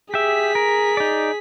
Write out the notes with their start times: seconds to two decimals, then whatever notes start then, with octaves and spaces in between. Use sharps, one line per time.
0.14 G4 G#4 E5 B6
0.55 A#4
0.97 D#4 D5